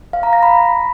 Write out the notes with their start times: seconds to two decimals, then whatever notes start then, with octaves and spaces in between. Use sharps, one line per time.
0.13 F5
0.23 A#5
0.33 A#6
0.43 B5